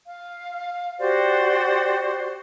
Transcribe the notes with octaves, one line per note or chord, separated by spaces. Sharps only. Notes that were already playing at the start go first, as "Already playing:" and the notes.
F5
F#4 G4 C5 D5